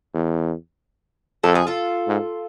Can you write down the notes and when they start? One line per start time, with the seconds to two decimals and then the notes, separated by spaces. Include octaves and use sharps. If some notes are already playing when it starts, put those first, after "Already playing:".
0.15 E2
1.44 F2 A4
1.55 G#4
1.67 F4 A4
2.08 G#2